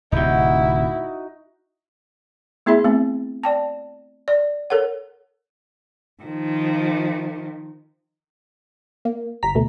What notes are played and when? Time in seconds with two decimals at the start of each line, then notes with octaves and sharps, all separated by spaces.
0.12 D1 C3 D#4 E4 F#4
2.66 A3 B3 E4 G#4 E5 B5
2.84 A3 B3 C4
3.44 D5 G5 A5
4.28 D5
4.70 A4 A#4 C#5 F#5
6.23 D#3 F3
9.05 A#3
9.43 G1 A#5 B6
9.55 D2 B2 A3